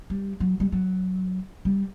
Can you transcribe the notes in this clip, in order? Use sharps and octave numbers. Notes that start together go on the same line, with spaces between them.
G3
F#3
G3
F#3
G3